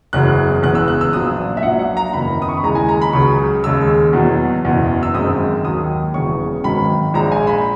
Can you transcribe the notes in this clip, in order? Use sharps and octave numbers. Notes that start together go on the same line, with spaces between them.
F#1 E2 C#3 F#3 F#6
E1 E2 C#3 F#6
E6
F#6
E6
A#1 A#2 F#3 D#6
E5
A#1 A#2 F#3 F#5
F#5
A#5
F#1 E2 D#3 B5
D#6
C#6
B5
D#2 C#3 E3 G#3 A#5
G#5
A#5
B5
C#2 C#3 F#3 C#6
D#2 C#3 G#3 E6
E2 B2 F#3
F#1 E2 B2
E6
G#1 F#2 D#3 G#3 D#6
D#2 D#3 F#3 D#6
E1 E2 C#3 F#3 C#6
G#1 G#2 D#3 F#3 B5
A#1 A#2 G#3 A#5
G#5
B5